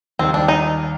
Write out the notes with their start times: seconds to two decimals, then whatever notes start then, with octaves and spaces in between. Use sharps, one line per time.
0.19 D#2 D#3 G3 C4
0.34 D4
0.48 D#4